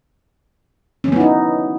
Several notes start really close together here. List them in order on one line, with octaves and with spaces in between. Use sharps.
C#4 F#3 B3 E4 D#4